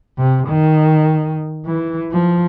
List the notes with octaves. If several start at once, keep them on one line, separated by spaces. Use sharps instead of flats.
C3
D#3
E3
F3